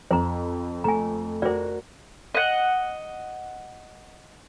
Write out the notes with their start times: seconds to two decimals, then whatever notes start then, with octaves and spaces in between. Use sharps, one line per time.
0.11 F2 C5 A#5
0.84 A3 G#5 A#5
1.42 F#4 A#4 C5 D5
2.35 D#5 F#5